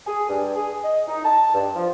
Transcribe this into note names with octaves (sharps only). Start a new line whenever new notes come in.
G#4
G2
G#4
D#5
D#4
A5
G2
F3